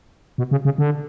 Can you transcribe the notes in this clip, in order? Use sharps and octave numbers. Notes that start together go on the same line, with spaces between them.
B2
C#3
C#3
D3